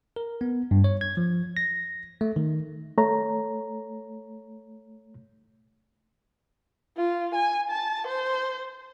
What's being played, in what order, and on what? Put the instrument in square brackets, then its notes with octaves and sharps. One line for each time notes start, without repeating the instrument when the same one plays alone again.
[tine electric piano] A#4
B3
G2
C#5
G#6
F3
A#6
A3
D#3
[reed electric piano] A3 C#5 A#5
[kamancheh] F4
G#5
A5
C5